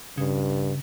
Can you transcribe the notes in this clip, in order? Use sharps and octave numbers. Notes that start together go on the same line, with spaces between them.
G2 C#3